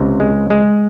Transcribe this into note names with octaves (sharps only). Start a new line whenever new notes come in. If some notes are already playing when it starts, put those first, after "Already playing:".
Already playing: C#2 C3
G#3
G#3